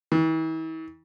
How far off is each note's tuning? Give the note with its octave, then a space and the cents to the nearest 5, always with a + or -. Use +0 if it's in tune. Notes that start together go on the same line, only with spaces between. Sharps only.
E3 -45